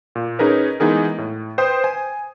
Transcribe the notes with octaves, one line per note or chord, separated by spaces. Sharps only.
A#2
C#4 D#4 G#4 A#4 B4
E3 G#3 B3 D#4 G#4 A#4
A2
B4 C5 G5 D#6
G#5